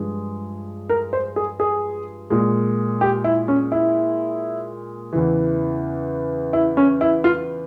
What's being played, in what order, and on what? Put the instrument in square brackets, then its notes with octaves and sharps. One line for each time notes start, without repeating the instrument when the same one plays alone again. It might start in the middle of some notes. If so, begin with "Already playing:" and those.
Already playing: [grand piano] G2 F3 G#3
A#4
C5
G#4
G#4
A#2 G#3
G4
E4
C#4
E4
E2 C#3 E3
E4
C#4
E4
F4